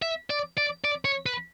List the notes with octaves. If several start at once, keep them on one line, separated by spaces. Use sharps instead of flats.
E5
D5
D5
D5
C#5
B4